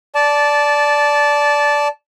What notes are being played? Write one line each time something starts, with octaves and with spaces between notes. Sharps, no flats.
D5 A5